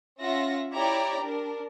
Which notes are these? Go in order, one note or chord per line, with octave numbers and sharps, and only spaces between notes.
C#4 F4 E5 F#5 A#6
E4 G4 C#5 D5 G5 A#5
D4 A#4